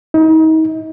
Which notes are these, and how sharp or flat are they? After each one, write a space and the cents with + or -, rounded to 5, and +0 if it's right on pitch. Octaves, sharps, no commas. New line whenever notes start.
D#4 +35